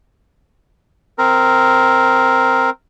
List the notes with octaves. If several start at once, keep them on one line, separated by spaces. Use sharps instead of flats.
C4 A#4